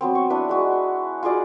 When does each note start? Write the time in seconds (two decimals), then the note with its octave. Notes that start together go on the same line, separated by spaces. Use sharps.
0.01 F#3 B3 C4
0.15 C#6
0.30 D4 E4 B4
0.49 G#3 F#4
1.23 F4 F#4 G#4 D5